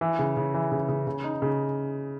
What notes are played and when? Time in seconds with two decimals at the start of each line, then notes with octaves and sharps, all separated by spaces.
0.01 E3
0.19 C#3
0.37 C#3
0.54 E3
0.72 C#3
0.88 C#3
1.07 C#3
1.24 D#4
1.42 C#3